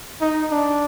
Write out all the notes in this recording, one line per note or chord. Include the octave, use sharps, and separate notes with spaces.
D#4
D4